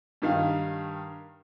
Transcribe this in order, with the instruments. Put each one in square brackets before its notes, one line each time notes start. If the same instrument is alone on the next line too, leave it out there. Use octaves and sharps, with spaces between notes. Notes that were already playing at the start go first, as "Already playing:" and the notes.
[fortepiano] G2 D#3 F5